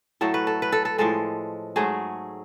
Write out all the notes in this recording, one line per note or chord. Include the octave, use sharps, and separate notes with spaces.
A2 F#3 A3 A4
B4
A4
B4
A4
A4
A2 F3 G#3 A4
G#2 F#3 A3 G#4